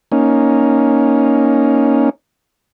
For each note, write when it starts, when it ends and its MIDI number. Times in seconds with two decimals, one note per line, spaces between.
0.12 2.10 58
0.12 2.10 61
0.12 2.10 63